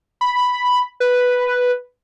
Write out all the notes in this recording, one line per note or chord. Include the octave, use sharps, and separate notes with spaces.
B5
B4